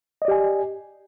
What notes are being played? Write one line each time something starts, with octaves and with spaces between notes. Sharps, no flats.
G4 D5 D#5 G#5